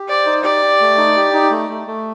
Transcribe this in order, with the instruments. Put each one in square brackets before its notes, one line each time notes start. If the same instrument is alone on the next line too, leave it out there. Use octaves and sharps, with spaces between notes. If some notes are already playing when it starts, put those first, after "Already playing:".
Already playing: [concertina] G4
[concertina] C5 [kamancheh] D5
[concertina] D#4
[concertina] G4 [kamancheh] D5
[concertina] G4
A3
D#4
G4
D#4
A3
A3
A3